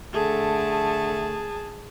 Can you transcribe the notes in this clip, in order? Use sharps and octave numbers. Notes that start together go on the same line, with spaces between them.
D3 A3 G#4 A5